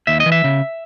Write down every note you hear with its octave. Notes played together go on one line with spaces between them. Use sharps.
D#2 E5
D#5
E3
E5
C#3